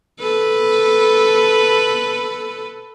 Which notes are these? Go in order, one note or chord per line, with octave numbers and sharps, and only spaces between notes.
A4 B4